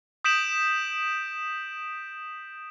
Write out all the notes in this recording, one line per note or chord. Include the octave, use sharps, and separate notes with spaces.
D#6 G6 B6 D7 E7 F#7